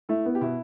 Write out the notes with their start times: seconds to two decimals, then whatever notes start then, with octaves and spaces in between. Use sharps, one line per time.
0.09 A3 E4
0.25 B3
0.35 G4
0.41 B2 E4